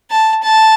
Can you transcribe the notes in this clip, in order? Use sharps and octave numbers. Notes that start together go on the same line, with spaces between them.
A5
A5